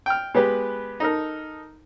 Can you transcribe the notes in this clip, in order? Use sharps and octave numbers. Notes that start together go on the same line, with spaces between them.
G5 F6
G#3 B3 G4 B4
D#4 A4 A#4